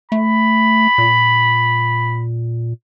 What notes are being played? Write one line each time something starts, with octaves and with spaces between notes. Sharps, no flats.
A3 B5
A#2